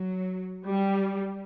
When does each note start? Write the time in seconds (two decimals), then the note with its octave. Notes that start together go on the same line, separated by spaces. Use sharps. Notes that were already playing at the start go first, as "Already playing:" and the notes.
Already playing: F#3
0.65 G3